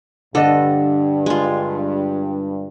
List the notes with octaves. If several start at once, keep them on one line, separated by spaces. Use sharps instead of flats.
G2 D3 D4 A4 D#5
G#3 F4